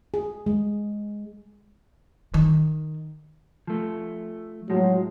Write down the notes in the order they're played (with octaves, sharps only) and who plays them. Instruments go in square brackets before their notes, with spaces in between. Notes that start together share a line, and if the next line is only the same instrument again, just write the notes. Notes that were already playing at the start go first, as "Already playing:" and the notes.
[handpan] G#4
G#3
[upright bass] D#3
[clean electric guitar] F3 A3
[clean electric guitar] A2 F3 G#3 [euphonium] F#3